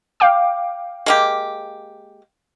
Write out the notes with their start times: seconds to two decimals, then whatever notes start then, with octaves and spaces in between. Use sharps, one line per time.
0.20 F5 G5 D6
1.06 G#3 A#3 G4